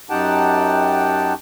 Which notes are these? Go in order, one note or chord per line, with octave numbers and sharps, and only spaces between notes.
F#2 D#4 G4 F#5 G5 A5